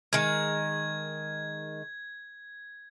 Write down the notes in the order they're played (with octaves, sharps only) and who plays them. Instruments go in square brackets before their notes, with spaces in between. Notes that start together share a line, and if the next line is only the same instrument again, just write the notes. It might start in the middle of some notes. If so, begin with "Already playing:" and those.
[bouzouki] D#3 G#3 [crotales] G#6